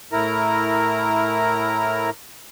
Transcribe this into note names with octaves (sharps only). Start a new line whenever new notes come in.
A2 E4 A#4 A#5